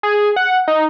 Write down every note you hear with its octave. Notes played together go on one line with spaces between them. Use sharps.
G#4
F#5
D#4